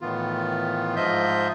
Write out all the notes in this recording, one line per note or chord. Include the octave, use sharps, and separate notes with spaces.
A2 D#3 E3 B3 F4
G#2 F3 F4 D#5 E5 G6